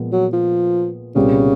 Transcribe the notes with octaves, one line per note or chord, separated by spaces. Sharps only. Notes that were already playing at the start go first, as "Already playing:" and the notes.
Already playing: A#2 F3 G#3 B3
F#3
F3
C2 A#2 C#3 G3 B3